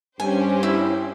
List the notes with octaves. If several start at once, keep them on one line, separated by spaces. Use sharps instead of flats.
G2 C#4 G4 C5 G#5
E4